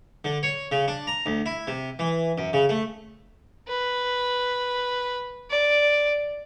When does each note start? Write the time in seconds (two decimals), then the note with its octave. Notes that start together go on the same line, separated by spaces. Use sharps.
0.25 D3
0.43 C#5
0.72 C#3
0.88 D4
1.07 A#5
1.26 D2
1.46 E4
1.67 C3
1.99 E3
2.38 F#2
2.53 C#3
2.69 A3
3.68 B4
5.51 D5